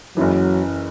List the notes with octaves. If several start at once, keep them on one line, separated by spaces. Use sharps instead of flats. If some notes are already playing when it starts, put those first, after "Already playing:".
F#1 F#2 E3 F#3